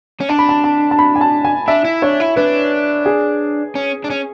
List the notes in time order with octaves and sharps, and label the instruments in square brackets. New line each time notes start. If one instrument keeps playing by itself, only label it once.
[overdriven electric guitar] C#4
[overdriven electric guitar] D4 [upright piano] A5
[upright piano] B5
A5
A5
A5
B5
G#5
A5
G#5
[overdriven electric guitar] D4 [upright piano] E5
[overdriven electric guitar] E4
[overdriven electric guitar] D4 [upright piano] C#5
[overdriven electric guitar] E4
[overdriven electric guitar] D4 [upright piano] B4
[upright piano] G#4
[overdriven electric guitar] C#4
D4
C#4